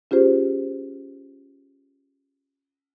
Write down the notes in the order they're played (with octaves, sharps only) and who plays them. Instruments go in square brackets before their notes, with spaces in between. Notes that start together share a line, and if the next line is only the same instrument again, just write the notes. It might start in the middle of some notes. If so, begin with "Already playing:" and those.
[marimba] C#4 F4 G4 G#4 C5